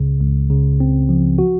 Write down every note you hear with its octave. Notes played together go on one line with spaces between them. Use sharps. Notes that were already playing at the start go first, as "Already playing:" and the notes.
Already playing: C#2 C#3
C#2
C#3
C4
F3
F#4